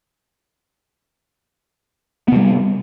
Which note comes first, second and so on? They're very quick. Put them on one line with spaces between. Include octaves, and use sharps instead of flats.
B3 C3 G3